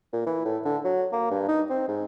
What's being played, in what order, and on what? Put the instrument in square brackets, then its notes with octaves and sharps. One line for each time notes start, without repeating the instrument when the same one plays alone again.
[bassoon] A#2
E3
A2
D3
F#3
A#3
G2
D#4
C4
G#2